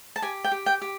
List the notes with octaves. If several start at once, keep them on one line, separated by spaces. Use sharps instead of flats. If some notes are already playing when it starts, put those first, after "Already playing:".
A5
G4 G#5
G5
G4
G5
G4